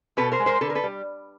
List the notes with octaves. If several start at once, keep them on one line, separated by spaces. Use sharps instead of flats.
B2 A4 B4
A#4 C5
G#3
A#4 C5
D3 A4 B4
A#4
A4 B4
G3